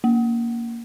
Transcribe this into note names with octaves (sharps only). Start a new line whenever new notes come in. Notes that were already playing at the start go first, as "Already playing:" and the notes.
A#3